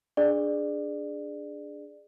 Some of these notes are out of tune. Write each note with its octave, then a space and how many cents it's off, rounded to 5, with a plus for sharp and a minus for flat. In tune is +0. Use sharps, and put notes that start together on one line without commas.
D4 +0 G#4 +0 D5 +20